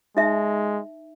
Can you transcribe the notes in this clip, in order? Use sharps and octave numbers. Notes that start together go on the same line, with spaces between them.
G#3 D#4 E5